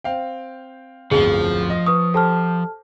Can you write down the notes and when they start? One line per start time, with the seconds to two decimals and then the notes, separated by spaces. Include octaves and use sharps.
0.04 C4 F5 G5
1.11 D1 G1 F2 F3 G#4
1.70 D#5
1.86 B4 C#6 D#6
2.14 G4 A4 C5 A5 F6